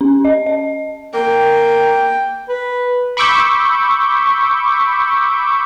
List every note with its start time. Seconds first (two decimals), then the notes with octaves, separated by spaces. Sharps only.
0.01 C#4
0.25 D#5
0.46 D#5
1.14 A#3 G5
2.49 B4
3.17 B5 C#6 D6 E6 G6